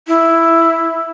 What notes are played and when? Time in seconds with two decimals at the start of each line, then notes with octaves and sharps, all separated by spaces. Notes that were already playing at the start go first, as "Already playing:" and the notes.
0.08 E4